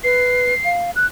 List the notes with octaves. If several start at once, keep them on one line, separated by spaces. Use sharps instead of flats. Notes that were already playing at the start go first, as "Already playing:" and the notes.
B4 C7
F5
F#6